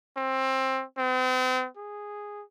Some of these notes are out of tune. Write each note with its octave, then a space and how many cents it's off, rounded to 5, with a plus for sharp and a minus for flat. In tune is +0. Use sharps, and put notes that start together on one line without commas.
C4 +20
C4 -40
G#4 -5